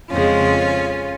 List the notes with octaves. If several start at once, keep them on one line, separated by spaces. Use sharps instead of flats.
F2 C#3 G#3 C#4 F4